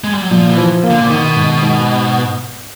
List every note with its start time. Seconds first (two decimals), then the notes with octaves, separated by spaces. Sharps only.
0.04 G#3
0.13 G3
0.22 F#3
0.31 A#2 F3
0.50 E3
0.57 F3
0.83 A#3
0.90 D3
1.01 A#2
1.10 B2 D#3
1.36 G#2
1.62 G#2